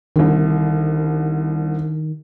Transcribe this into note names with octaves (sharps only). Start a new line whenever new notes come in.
C2 D3 D#3